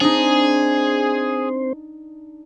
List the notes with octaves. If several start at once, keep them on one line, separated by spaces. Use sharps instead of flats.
C4 D4 D#4 G#4 C5